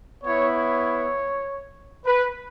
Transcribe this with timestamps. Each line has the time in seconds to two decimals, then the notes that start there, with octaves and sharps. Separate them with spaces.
0.23 B3 E4 C#5
0.53 C#5
2.05 B4